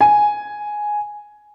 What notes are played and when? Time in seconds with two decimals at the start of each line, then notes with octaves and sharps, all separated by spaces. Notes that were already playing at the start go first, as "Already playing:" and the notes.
0.01 G#5